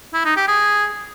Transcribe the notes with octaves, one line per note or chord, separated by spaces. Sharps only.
E4
D#4
G4
G#4